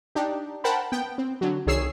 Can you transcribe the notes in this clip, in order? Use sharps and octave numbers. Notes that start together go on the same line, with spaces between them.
D4 D#4 G4
A#4 C5 F#5 G5 A5 B5
B3 G5
C4
D3 F#3
C2 D#3 G#4 C#5 E6 C7